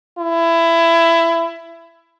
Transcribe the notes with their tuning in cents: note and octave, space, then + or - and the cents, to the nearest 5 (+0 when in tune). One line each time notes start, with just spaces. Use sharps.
E4 +20